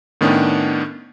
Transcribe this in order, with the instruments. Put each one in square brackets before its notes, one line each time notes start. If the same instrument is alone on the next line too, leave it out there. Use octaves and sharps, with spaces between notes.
[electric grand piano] A2 D#3 B3 C#4 D4